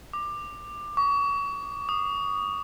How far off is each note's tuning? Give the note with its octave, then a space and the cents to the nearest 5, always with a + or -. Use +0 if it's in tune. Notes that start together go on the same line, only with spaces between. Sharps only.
D6 +20
C#6 +30
D#6 -25